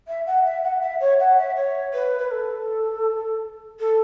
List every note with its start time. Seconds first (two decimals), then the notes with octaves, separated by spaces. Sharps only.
0.07 E5
0.26 F#5
0.44 E5
0.63 F#5
0.81 E5
1.00 C#5
1.19 F#5
1.38 E5
1.56 C#5
1.93 B4
2.18 B4
2.30 A4
3.79 A4